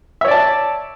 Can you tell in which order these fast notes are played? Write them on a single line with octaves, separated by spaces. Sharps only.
E5 C#5 D5 A5